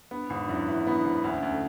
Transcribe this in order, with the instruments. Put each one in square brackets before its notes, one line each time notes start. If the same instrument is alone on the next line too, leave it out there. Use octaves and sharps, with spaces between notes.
[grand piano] B3 [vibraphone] D4
[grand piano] G#1
[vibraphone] D4
[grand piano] F#2 [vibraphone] E4
[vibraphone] D4
[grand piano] E3 [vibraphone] E4
[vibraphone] D4
E4
[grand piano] B3
[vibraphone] D4
E4
[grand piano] G#1 [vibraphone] D4
[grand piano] D2 [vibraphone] C#4
[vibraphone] D4
C#4
[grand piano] D2
[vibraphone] F#4 A4